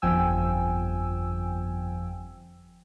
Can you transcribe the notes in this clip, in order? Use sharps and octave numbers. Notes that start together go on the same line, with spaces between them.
G1 F2 F3 G5 G#5 E6